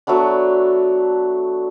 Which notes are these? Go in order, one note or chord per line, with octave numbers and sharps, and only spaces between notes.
F#3 A3 B3 D4